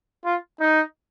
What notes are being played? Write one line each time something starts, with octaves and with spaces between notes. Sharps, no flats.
F4
D#4